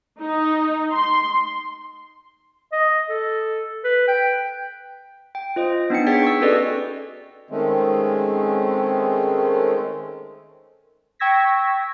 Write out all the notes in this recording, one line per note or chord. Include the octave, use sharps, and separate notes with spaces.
D#4
C6
D#5
A4
B4
G5
G5
F4 C5 D#5
B3 D4 D#4 G5 C#7
G#4 C#5 G5 A6 B6
C#6 E6
C#4 F#4 A4 B4 D5 D#5
D#3 G#3 A3 C4 C#4
G5 C#6 E6 G#6 A#6 B6